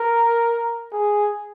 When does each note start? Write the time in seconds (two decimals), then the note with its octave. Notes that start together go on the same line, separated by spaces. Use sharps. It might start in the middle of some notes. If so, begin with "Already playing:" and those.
Already playing: A#4
0.92 G#4